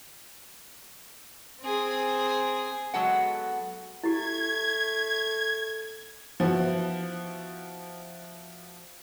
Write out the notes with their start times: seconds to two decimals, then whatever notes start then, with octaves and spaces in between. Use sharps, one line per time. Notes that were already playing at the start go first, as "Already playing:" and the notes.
1.62 C4 G#4
2.94 F#3 G#3 B3 F#4 A4 F#5
4.04 A3 E4 G4 G#6
6.40 F3 B3 E4 F#4